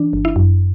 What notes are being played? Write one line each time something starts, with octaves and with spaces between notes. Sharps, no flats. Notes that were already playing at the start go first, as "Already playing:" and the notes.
Already playing: E3 D4
G1
E4
F#2